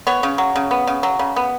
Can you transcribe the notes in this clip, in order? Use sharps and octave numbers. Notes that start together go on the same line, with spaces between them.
B3 C#5
C#3
F#3
C#3
B3
C#3
F#3
C#3
B3